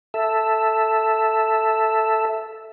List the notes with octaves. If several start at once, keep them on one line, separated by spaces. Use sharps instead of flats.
A4 E5